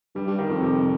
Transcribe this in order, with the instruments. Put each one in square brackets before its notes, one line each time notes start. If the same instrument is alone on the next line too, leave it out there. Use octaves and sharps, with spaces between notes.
[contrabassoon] G2 [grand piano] G3
[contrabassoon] G2
[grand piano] D#3
[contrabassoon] F2
[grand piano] C3